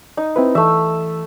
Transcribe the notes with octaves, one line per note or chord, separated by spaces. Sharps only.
D#4
C4 E4 B4
E3 A3 E5